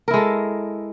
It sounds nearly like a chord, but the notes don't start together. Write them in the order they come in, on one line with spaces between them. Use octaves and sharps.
A#4 E4 G#3 A4